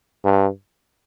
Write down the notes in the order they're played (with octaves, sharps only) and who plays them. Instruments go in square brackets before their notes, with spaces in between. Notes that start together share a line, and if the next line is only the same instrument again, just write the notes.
[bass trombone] G2